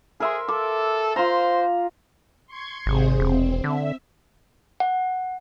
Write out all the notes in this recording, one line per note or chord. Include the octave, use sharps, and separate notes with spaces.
G#4 A#4 E5 C6
A4 D6
F4 C5 A#5
C6 C#6 G#6
G#1 C3 G#4 C5
E1 C4
D3 E5
F#5